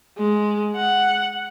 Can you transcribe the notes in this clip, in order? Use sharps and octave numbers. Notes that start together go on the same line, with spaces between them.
G#3
F#5